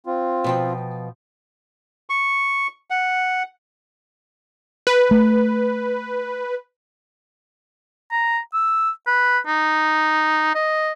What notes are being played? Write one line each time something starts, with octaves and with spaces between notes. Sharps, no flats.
C4 F4
B2 F3 G5
C#6
F#5
B4
A3
A#5
E6
B4
D#4
D#5